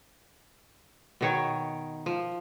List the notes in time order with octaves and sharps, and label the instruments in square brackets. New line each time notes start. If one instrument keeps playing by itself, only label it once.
[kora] B2 D#3 C#5
F3